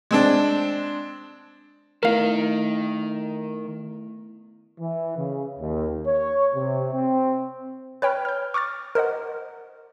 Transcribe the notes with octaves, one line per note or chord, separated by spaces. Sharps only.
G#3 C4 D4
D#3 A3 B3 E4 A#4 F5
E3
C#3
D#2
C#5
C3
C4
B4 C#5 G5 B5 F6
F6 G6
C#6 D6 F6 A6
A#4 C5 D#5 F#5